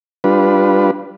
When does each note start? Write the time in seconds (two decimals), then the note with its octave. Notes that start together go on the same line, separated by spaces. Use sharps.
0.24 G3 D4 F4 B4